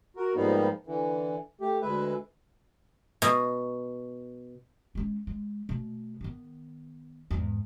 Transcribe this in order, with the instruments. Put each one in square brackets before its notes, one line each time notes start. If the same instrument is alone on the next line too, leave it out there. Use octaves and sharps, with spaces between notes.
[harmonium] F#4 A#4
G#2 F3 G3 A#3 B3 D#4
D3 E3
A3 G4
D2 G#3 B4 E5
[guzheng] B2
[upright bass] G#3 C#4
G#3
B2 A3
D#3 B3
E2 G#2